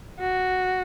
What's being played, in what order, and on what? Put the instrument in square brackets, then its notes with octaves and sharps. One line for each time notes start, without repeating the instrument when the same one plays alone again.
[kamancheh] F#4